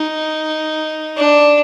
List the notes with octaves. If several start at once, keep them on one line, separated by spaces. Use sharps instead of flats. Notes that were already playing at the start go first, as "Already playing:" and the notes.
Already playing: D#4
D4